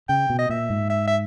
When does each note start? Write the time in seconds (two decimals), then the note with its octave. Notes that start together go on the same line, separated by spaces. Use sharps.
0.09 C#3 G5
0.30 B2
0.38 D#5
0.49 A#2 E5
0.70 G#2
0.90 E5
1.07 E5